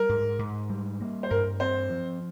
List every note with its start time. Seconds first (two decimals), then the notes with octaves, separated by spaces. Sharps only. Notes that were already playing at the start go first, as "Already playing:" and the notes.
Already playing: G3 A#4
0.09 G#2
0.39 G#2
0.70 G3
1.01 A#3
1.23 C5
1.30 G2 A#4
1.60 C4 C5
1.90 F3